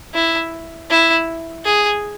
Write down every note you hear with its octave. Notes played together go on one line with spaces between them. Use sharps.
E4
E4
G#4